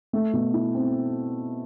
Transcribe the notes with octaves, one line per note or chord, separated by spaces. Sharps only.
A3
B2
E4
C4